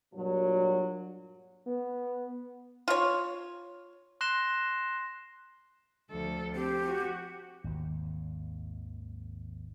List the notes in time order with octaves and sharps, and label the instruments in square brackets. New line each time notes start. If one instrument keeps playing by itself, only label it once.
[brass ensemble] G2 A#2 F#3
[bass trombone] B3
[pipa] F4 C#5
[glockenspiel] C6 F#6 A#6 C7 E7 G7
[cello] D2 A4 [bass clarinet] F3
[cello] C4 [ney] G4
[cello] F#4
[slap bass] G#1 D#2